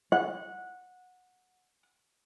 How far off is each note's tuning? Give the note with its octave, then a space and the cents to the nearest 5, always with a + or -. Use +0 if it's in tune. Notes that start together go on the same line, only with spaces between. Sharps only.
F#5 -15